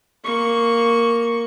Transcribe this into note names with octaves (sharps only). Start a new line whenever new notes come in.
A#3 C#6